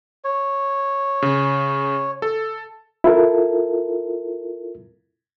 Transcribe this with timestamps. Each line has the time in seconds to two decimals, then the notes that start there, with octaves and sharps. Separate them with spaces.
0.24 C#5
1.22 C#3
2.22 A4
3.04 E4 F4 A4 A#4